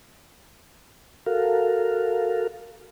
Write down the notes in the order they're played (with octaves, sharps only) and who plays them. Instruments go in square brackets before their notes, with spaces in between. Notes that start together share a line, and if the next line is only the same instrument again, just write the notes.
[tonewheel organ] F#4 A4 A#4 F5